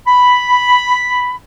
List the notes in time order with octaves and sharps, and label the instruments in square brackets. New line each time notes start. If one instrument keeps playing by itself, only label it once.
[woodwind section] B5